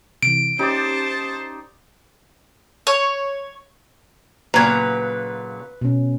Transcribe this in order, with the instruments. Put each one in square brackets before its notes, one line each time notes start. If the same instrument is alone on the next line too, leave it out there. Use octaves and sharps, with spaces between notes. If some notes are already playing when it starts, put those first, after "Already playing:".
[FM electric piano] C3 E3 [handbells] D7
[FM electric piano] C#4 G4 [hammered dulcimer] D#4 D5 [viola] C5 A5
[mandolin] C#5
[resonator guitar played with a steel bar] A#2 C#3 F#3 [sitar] B4 [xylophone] A#5 G#6
[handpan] B2 C#4